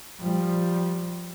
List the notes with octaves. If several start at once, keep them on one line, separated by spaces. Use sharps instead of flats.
F3 G3